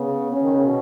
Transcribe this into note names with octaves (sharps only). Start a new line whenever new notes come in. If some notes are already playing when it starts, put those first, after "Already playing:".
Already playing: C#3 B3
C#4
D#3
C#3
B2